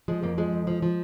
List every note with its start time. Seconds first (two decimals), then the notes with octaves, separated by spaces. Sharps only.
0.08 F3 G#3
0.23 F2 A#3
0.38 F3 G#3
0.53 F2
0.67 F3
0.82 F3